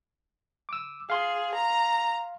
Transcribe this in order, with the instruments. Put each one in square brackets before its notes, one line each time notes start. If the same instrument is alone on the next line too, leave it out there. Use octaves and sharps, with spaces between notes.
[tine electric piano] D6 E6
[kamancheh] G#4 [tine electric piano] F5 C6
[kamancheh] A#5